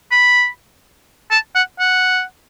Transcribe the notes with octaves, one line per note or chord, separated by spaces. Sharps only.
B5
A5
F#5
F#5